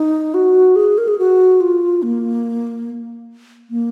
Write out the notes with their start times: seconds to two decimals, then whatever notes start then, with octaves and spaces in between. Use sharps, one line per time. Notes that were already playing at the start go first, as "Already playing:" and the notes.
Already playing: D#4
0.34 F#4
0.76 G#4
0.98 A#4
1.08 G#4
1.19 F#4
1.61 F4
2.03 A#3
3.70 A#3